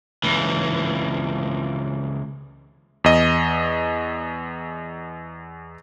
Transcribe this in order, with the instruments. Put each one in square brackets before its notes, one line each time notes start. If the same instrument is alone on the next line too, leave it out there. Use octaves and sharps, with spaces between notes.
[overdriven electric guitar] C#2 E3
[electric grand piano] E2 D#5